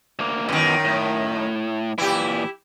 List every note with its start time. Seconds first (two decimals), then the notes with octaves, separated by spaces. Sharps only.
0.19 D2 A#3
0.49 F#2 B2 D#3 E3
0.85 A2
1.98 A#2 E3 E4 G4